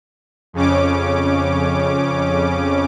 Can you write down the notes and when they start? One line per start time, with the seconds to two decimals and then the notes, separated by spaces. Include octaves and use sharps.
0.53 F2 C#3 C#4 D6